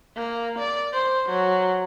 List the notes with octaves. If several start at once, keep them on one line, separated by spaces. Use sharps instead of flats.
A#3
D5
C5
F#3